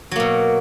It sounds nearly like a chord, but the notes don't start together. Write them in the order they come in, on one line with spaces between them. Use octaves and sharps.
F#3 A#3 B2